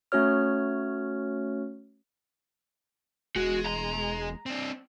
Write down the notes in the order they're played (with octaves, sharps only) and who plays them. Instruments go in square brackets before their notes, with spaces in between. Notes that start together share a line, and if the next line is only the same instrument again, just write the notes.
[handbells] A3 C#4 F#4 C#5 F6
[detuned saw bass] E1 [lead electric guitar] G#3 [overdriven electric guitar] F#4
[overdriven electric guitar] A#5
[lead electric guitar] C4 D4